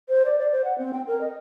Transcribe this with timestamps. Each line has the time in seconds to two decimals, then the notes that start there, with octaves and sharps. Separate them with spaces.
0.09 C5
0.25 D5
0.39 D5
0.52 C5
0.64 F#5
0.78 C4
0.93 G5
1.07 A#4
1.21 D#5